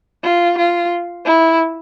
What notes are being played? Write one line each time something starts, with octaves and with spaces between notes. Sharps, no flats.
F4
F4
E4